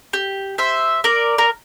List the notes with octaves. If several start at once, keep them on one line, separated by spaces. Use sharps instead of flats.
G4
C5 E5
A#4 D5
A#4